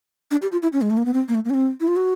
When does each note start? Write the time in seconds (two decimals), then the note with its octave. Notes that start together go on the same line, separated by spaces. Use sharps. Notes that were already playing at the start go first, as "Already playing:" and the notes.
0.31 D4
0.42 G4
0.52 F4
0.62 E4
0.73 C#4
0.82 G#3
0.90 A3
0.97 A#3
1.05 B3
1.14 C4
1.28 A#3
1.35 A3
1.45 A#3
1.50 C#4
1.54 C4
1.81 E4
1.88 F4
1.96 F#4